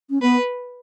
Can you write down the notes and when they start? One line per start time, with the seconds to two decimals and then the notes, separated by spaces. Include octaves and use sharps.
0.10 C#4
0.22 B3 B4